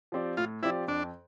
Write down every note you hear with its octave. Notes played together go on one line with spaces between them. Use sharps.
F3 C4 G4 D5
A2 F4
F3 C4 E4 G4 D5
F2 D4